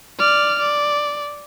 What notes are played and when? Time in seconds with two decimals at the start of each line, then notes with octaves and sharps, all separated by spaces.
0.18 D5 F6
0.59 D5